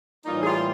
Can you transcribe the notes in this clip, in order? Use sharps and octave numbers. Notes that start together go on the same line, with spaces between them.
A2 E3 G3 A#3 D#4 F4
G#4
F4 G4